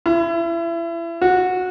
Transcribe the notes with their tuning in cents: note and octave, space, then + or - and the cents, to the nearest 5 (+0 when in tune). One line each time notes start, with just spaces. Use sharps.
E4 +30
F#4 -15